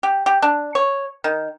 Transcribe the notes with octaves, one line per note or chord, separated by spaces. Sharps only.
G4
G4
D4
C#5
D#3